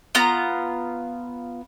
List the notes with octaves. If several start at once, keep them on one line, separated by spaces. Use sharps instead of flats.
B3 F4 A#5